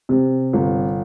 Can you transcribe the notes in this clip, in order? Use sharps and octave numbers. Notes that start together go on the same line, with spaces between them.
C3
G1